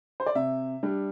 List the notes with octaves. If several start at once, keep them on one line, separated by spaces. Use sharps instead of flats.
C5
D5
C3 E5
G3 D4